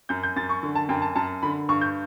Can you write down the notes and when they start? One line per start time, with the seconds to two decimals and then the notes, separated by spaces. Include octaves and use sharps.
0.09 F#2 G6
0.23 G6
0.36 F#2 A6
0.49 C#6
0.63 D3
0.75 A5
0.89 F#2 G5
1.02 A5
1.16 F#2 A5
1.43 D3 B5
1.69 G2 C#6
1.81 G6